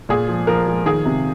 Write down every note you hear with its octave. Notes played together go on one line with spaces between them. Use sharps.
A#2 G#4
F3
F3 A#4
F3
D#3 G#4
C3